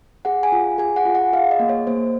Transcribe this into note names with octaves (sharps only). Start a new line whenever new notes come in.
G#4 F#5
G#5
F4
G#4 G#5
F#5
F4
F#5
G#4 F5
D#5
A#3
C#5
A#3 C5